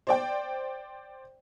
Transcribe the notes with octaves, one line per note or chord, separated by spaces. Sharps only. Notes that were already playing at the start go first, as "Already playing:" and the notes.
C5 D5 G5